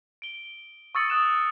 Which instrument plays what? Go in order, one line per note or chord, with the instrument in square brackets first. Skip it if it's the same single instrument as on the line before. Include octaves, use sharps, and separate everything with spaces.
[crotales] D7 G7
C#6 D#6 E6 A6 C#7 F#7
C#6 D#6 F#6 E7